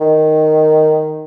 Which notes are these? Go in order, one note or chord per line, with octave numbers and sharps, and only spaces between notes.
D#3